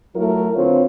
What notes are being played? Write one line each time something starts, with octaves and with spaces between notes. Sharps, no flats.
F#3 A3 E4 F4 A#4
D2 C4 F4 B4 C#5